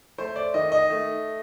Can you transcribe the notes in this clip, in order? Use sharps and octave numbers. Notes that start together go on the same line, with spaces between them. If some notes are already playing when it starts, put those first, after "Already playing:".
A3 C5
D5
D#3 D#5
D#5
A3